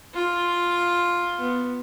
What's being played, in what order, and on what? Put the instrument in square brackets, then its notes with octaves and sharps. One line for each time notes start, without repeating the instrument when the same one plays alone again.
[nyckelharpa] F4
B3